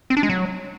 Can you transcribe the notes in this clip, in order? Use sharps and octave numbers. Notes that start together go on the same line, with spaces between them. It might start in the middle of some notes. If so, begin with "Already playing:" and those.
C4
D4
G#3
F#3